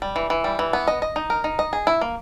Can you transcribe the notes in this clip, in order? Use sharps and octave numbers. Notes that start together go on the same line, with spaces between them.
G3
E3
E3
G3
E3
B3
D#5
D#5
D#4
A#4
D#4
D#5
G#4
E4
A#3